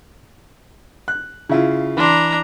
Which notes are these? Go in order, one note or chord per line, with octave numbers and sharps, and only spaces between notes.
F#6
C#3 E4 F4
E3 D4 A#5 C6